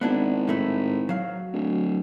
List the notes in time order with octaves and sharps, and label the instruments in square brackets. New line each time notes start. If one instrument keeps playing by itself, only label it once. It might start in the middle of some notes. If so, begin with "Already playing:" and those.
[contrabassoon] G#1 [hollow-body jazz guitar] B3 D4 E4
[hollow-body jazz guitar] A2 A3 E4
F#3 F5
[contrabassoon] D1